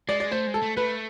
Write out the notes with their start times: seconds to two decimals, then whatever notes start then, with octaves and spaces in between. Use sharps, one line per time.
0.09 G#3 D5
0.20 D5
0.32 A3 C5
0.47 G#3
0.54 A4
0.62 A3
0.77 A3 B4